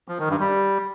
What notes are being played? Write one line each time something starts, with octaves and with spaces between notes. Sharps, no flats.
F3
D#3
G2
G3